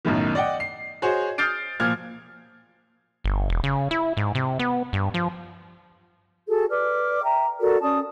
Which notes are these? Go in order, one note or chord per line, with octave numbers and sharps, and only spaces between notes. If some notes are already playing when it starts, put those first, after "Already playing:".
B1 F#2 A2 D#3
D5 D#5 F#5 G5
C7
F#4 G#4 C5 C#5 D#5
D#6 F6 G6 A6 C7 D7
A#2 F3 F6 G#6
G1
E1
C#3
E4
G#2
C3
B3
G2
F3
F#4 G#4 A4
B4 D5 D6 F6
E5 G5 A#5
F#4 A4 A#4 D5
C#4 D5 A5 D#6